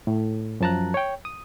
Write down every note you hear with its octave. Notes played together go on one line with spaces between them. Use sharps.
A2
F#2 F3 A5 A#5 F#6
C#5 G5
D#6